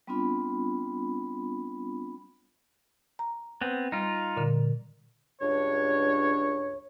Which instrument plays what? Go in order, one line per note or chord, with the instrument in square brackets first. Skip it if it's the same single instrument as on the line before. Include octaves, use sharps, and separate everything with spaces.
[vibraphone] G3 B3 C4 D4 F4 B5
[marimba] A#5
[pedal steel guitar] B3 C4
[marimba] G3 [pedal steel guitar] D#4 F4
[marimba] A#2 D3
[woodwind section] C#2 G2 D4 C#5